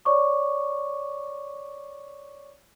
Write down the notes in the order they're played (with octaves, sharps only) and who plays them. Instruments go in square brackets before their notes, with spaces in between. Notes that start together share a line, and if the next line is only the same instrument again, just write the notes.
[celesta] C#5 D5 C#6 D6